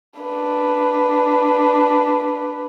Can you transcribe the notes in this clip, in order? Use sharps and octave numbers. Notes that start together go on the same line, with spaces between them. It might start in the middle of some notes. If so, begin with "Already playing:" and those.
D4 B4